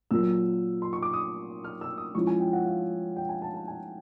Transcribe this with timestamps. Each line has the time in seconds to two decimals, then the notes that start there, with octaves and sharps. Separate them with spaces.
0.11 A#2 F#3 A#3 E6
0.82 C6
0.93 C#6
1.02 D6
1.13 D#6
1.64 F6
1.81 E6
1.97 D#6
2.15 F3 G#3 C#4 E4 C#6
2.27 G#5
2.40 G5
2.53 F#5
2.66 F5
3.16 G5
3.29 G#5
3.42 A5
3.54 A5
3.68 G#5